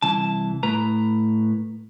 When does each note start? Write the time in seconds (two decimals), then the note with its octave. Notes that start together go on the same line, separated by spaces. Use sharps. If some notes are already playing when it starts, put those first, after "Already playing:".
0.02 C2 E3 A5
0.63 A2 B4 A#5